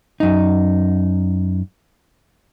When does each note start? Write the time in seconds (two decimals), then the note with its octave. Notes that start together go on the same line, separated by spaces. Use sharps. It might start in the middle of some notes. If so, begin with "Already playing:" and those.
0.20 F#2 D#4